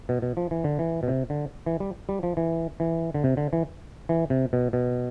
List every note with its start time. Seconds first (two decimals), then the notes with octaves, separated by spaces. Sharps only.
0.09 B2
0.22 B2
0.37 F3
0.51 E3
0.64 D3
0.79 E3
1.03 B2
1.08 C3
1.30 D3
1.66 E3
1.80 G3
2.09 G3
2.23 F3
2.37 E3
2.80 E3
3.14 D3
3.24 C3
3.37 D3
3.53 E3
4.09 E3
4.30 C3
4.53 B2
4.73 B2